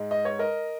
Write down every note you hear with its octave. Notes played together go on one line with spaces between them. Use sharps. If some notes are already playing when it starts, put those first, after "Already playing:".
Already playing: G#2 G#3
D#5
C#5
A#4 D#5